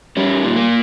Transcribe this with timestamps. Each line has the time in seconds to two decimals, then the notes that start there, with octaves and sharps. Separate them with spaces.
0.17 G3 C#4
0.43 A#2
0.56 A#3